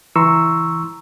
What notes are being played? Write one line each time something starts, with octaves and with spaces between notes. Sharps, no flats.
C#2 E3 A#5 C6 C#6 E6